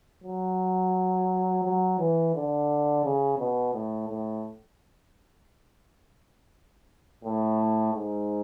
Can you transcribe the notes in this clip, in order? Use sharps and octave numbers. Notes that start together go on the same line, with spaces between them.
F#3
F#3
E3
D3
C#3
B2
A2
A2
A2
G#2